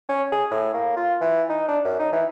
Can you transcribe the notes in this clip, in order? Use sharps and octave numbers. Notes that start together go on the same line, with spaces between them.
C#4
G#4
A2
A#3
F4
E3
D#4
D4
F#2
D#4
E3